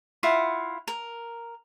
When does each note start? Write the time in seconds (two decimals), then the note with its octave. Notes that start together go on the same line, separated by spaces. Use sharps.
0.23 E4 F4 F5 F#5
0.88 A#4